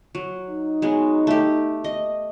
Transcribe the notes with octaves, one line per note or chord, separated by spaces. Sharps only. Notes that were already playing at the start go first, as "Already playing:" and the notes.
F#3
D#4
F#3 G#3 B3
A3 G4
D#5